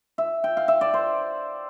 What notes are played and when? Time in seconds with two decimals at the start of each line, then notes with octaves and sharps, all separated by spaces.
0.18 E5
0.44 G5
0.57 F5
0.68 E5
0.81 D5
0.94 C5